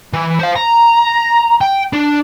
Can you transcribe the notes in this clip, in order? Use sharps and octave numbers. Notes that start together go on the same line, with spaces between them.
E3
C5 F5
A#5
G5
D4